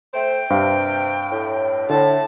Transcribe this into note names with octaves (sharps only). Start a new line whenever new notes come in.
A3 C5 G5
G2 C3 F5
A2
A2 D3 A5